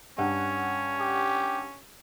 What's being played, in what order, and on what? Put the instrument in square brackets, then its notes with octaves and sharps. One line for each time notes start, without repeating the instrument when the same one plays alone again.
[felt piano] G2 F#5 G5 [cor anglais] C#4
[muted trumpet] G4